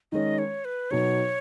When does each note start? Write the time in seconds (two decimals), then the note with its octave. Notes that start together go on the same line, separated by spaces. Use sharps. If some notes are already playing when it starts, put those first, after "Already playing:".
0.12 D#3 G#3 C#4 D#5
0.38 C#5
0.65 B4
0.91 B2 F#3 D#4 C#5